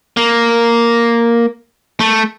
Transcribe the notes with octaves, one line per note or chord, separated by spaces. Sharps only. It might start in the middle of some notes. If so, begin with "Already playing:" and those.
A#3
A3